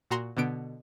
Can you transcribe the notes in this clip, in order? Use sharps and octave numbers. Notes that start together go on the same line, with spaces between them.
A#2 F#4 A#5 C6
B2 D3 B3 D7